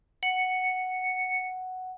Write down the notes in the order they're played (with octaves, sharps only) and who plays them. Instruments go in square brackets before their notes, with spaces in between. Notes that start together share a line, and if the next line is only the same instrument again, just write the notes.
[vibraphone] F#5 [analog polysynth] C#7